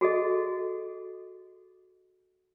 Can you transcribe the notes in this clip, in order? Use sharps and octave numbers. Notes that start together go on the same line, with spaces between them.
F#4 G#4 A4 D#5